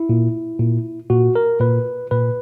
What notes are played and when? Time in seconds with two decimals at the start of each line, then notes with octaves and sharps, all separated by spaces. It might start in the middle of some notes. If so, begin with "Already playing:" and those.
Already playing: E4
0.09 A#2
0.60 A#2
1.10 A#2 F#4
1.35 A#4
1.60 A#2 B4
2.11 A#2 B4